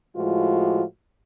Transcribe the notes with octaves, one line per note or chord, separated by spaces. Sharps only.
A2 F3 G#3 F4 F#4